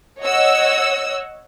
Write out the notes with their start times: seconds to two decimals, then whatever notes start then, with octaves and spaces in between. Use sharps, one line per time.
0.21 C#5 D#5 F#5 E6